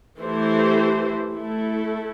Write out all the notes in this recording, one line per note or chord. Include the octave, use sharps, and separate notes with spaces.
E3 A3 E4 G4 C5
A3 E4 A4